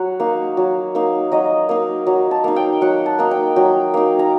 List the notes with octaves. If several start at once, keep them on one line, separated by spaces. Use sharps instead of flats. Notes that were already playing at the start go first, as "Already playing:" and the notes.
Already playing: F#3 F#5
A#3 D#4
F#3
A#3 D#4
F#3 D#5
A#3 D#4
F#3
A5
A#3 D#4
G5
F#3 F#5
A5
A#3 D#4
G5
F#3 G5
A#3 D#4
A#5